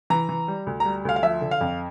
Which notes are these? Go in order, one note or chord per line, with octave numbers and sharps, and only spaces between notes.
E3 A#5
E3
G3
D2
G3 A#5
D2 F5
F5
F3 E5
D3
F5
F2